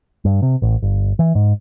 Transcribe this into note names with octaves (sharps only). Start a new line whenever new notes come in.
G2
C3
A1
G1
E3
G#2